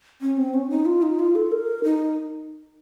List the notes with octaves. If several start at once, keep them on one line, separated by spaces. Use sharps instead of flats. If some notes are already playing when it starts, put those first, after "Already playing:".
C#4
C4
C#4
D#4
F4
D#4
F4
A4
A#4
D#4